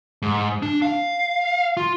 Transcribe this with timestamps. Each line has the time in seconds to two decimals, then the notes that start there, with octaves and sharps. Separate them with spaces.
0.22 G#2
0.63 D4
0.82 F5
1.77 F4